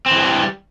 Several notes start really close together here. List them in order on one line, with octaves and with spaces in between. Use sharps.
C4 E3 G#3 G3